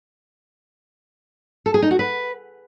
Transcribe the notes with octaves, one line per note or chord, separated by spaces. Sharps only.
A4
G#4
D#4
F#4
B4